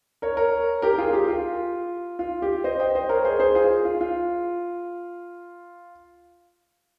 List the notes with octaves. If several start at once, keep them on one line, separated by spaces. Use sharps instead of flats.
A#4 C#5
A#4 C#5
G4 A#4
F4 G#4
G4
F4
F4
G4
C5 D#5
D#5 G5
C5 D#5
A#4 C#5
G#4 C5
G#4 C5
F4 G#4
F4
F4